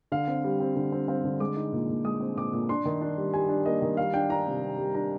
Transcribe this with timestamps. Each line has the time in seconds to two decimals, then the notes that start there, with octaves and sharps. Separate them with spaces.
0.12 D3 F5
0.28 C4
0.44 G3
0.60 C4
0.76 D3
0.92 C4
1.08 C4 F5
1.24 D3
1.40 G#3 D6
1.57 D#4
1.72 A#2
1.89 A#2
2.05 G#3 D#6
2.20 C4
2.36 A#2 D6
2.53 A#2
2.69 D4 C6
2.85 D#3
3.01 D4
3.17 G3
3.34 G3 G#5
3.49 D4
3.66 A#3 D#5
3.82 D#3
3.97 G3 F5
4.14 D4 G5
4.30 D4 A#5
4.47 C3
4.62 C3
4.78 G3
4.95 D4 A#5